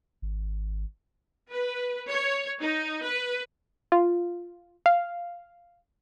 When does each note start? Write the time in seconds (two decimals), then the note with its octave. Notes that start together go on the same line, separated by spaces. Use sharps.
0.22 G#1
1.50 B4
2.08 C#5
2.61 D#4
3.04 B4
3.92 F4
4.86 F5